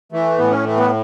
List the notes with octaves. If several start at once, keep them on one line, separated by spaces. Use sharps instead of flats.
E3 A3
A2 B3
C#4
E3 A3
B3